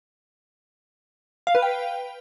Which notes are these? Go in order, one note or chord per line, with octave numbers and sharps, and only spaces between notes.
F5
B4
G5